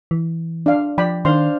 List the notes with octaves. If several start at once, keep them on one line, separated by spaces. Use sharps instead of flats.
E3
D4 F5
F3 D5 G5 B5
D#3 D4 C5 F5 C6